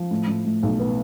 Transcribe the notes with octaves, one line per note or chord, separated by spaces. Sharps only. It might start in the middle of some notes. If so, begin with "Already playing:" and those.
Already playing: F3
A2
A2
A2
B1
B3